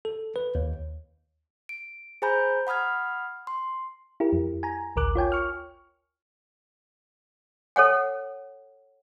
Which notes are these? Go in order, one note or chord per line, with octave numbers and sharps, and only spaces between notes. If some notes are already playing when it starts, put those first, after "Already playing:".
A4
B4
D#2
D7
G#4 C5 G#5 A#5 B5 G6
F#5 B5 D#6 F6 G#6
C6
E4 G4 A#4
F2
G#5 A#5
A1 D2 A#4 D6 F#6
F4 C#5 G5 G#5
C#6 F6
A4 C#5 F#5 G#5